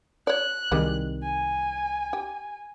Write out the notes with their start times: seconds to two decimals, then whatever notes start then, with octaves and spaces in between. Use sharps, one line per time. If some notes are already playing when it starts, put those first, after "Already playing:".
0.27 C#5 D5 F#6
0.72 C2 D#3 G3 G#3 C4
1.23 G#5
2.13 G4